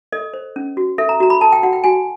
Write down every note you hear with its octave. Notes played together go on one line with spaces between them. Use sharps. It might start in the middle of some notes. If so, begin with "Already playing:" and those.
A4 D#5
C5
C#4
F#4
A4 E5
A#5
F#4 A#5
B5
A4 A5
G5
F#4 F#5
G5
F#4 G#5